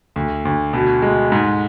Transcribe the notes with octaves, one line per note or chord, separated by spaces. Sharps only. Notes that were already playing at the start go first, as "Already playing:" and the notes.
D2
D2
B2
G#3
G#2